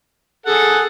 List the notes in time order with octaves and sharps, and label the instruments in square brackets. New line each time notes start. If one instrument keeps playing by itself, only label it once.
[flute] G#4 [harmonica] A4 F#5